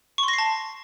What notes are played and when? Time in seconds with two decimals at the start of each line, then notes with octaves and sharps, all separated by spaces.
0.18 C#6
0.23 C6
0.28 A#6
0.33 C7
0.38 A5